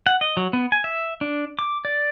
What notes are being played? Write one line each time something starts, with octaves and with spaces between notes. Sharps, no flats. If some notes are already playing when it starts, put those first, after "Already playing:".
F#5
D#5
F#3
B3
G#5
E5
D4
D6
D5